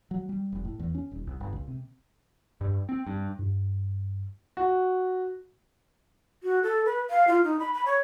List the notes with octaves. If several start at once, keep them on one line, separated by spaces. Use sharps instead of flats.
F#3
G3
F1
A2
E2
C#4
D#1
C2
G1
C#2
C3
G2
C4
G2
G2
F#4
F#4
A4
B4
F5
F4
D#4
B5
B5
C#5